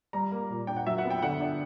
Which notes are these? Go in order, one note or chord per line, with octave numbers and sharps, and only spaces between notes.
G3 A#5
A#3
A#2
D4 G5
F#5
F#3 E5
F#5
B3
G5
D3 F#5
D4